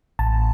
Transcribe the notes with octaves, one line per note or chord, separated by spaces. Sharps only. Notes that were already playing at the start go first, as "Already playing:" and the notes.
A1 A5